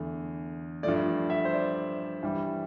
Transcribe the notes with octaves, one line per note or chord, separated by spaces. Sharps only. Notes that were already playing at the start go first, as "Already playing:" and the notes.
Already playing: E2 D3 A3
G2 F3 A3 D5
E5
C5
D5
G2 E3 G3